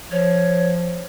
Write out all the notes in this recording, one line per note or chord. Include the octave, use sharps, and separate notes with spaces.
F3 C#5